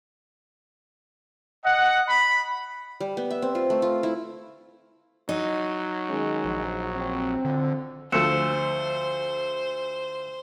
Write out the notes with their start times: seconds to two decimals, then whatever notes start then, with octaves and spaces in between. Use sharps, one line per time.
1.65 D#5 F#5
2.09 B5
3.00 G3
3.17 B3
3.30 E5
3.42 C4
3.55 F4
3.70 A3
3.82 F4
4.03 E4
5.29 F#3 D#4
6.09 D#3 G#3 C#4
6.45 A#1
6.95 C4
7.45 F2 D3
8.12 D2 F3 A3 C5 E6 C#7 E7